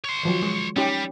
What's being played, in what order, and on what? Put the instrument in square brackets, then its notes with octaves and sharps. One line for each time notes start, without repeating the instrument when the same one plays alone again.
[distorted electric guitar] C#5 C6
[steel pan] D#3 F3 F#3
G#3
[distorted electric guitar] G3 [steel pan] C#4 D#4 G4